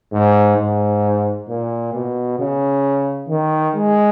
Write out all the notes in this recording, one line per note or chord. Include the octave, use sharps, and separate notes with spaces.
G#2
G#2
A#2
B2
C#3
D#3
G#3